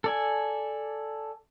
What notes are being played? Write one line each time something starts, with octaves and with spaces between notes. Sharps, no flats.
A4 D5 G#5